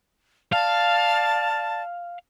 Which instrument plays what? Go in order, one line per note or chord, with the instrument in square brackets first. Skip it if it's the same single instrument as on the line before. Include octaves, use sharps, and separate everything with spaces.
[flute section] D5 A5 [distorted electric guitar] F5